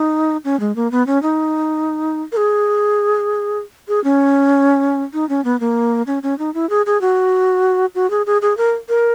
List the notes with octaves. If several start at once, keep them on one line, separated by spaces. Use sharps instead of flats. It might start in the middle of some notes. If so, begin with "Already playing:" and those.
Already playing: D#4
C#4
G#3
A#3
B3
C#4
D#4
A#4
G#4
G#4
C#4
D#4
C#4
B3
A#3
C#4
C#4
D#4
E4
G#4
G#4
F#4
F#4
G#4
G#4
G#4
A#4
A#4